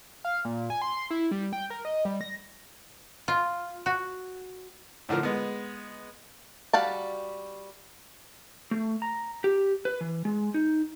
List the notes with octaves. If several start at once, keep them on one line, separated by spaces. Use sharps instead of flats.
F5
A#2
G#5
C6
C6
E4
G3
G5
A#4
D#5
G3
A#6
F4
F#4
A2 D3 F3 A#4
G#3 B3
G3 F#4 F5 A5
A3
A#5
G4
B4
E3
G#3
D#4